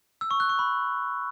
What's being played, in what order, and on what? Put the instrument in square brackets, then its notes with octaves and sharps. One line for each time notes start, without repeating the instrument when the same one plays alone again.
[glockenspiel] E6
C#6
F#6
C#6
B5